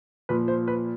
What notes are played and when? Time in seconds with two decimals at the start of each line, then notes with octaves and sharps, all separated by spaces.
0.29 A#2 F3 B4
0.48 C5
0.68 B4